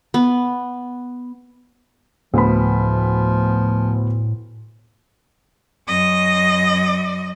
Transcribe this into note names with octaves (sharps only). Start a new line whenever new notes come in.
B3
D2 A2 F3 B3 B5
F#2 D#5